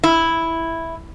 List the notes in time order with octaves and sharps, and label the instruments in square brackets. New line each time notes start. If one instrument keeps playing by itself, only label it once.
[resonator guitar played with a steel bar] E4